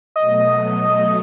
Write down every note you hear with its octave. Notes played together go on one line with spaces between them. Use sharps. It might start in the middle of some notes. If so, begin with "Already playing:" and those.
B2 F#3 A3 D#5